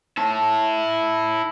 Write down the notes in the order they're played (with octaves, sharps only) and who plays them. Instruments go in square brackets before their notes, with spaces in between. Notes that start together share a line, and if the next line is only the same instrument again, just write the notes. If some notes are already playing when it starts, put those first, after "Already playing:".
[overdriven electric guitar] E4 A5